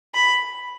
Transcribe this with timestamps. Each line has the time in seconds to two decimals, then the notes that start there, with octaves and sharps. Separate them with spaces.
0.15 B5